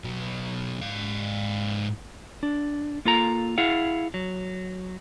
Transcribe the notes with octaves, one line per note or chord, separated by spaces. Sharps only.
B2 F#3
G#2 F5
D4
A#3 F4 A4 A#5
E4 G#4 F5 F#5
F#3